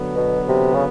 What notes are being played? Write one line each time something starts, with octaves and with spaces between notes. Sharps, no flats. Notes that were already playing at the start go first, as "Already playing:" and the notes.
Already playing: D3 F#3 B3
B2
C3
C#3